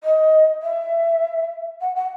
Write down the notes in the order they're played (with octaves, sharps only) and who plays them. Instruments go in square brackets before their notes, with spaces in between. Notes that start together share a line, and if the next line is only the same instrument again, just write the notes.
[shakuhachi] D#5
E5
F#5
F#5